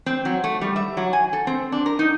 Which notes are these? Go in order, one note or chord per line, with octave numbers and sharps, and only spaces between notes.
C4
F#3
A3
G3
E5
F#3
G#5
A4
C4
D4
A#4
D#4